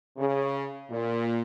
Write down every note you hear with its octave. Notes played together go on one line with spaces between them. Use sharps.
C#3
A#2